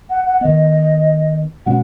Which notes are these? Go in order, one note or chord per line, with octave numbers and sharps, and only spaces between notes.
F#5
F#5
D#3 B3 D#5
B2 G#3 C#4 F#5